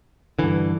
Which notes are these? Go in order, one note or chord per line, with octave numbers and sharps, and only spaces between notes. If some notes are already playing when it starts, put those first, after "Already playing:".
G2 D3 E3